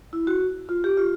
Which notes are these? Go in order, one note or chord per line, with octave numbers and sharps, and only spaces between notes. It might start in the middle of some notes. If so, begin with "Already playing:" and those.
E4
F#4
F4
G4
F4